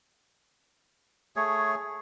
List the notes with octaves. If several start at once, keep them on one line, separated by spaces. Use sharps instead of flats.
A3 G#4 C#5